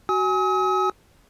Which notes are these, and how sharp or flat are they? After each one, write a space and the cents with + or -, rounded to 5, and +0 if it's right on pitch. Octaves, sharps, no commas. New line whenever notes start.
F#4 +20 G#5 +0 D#6 +45